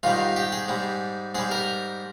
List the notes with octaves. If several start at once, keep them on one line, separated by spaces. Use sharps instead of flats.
G#2 D#3 G3 F4
G4
G#4
G#2 G3
G#2 G3 G#4
A#4